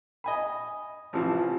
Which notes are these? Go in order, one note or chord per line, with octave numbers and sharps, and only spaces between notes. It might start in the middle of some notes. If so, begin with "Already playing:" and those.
D#5 G#5 B5
A1 C3 E3 F3